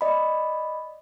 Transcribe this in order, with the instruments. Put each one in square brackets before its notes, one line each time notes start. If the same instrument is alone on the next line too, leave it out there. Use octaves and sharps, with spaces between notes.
[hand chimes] D5 D#5 B5